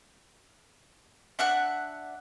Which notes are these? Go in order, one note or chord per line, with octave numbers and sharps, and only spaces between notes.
D4 E5 F#5 F#6